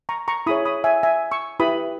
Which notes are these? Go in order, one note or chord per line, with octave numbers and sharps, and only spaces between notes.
A#5 C#6
A#5 C#6
E4 G#4 C#5 B5 D#6
B5 D#6
E5 G#5
E5 G#5
C#6 E6
E4 G4 B4 B5 D#6